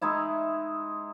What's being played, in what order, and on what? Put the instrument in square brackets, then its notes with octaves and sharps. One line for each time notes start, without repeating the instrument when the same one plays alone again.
[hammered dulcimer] G#3 D#4 E4 E5